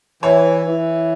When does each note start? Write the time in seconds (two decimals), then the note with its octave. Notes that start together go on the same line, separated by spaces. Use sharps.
0.23 E3 C#5
0.65 E3